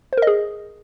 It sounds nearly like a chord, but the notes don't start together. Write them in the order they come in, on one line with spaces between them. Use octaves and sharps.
C5 A#4 D#5 G#4